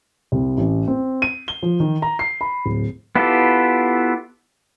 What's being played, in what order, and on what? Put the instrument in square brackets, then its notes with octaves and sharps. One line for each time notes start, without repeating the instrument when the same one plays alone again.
[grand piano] C2
A1
C4
D#7
G7
F3
D#3
A#5
C7
B5
D1
[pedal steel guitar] B3 E4 F4 G4 A4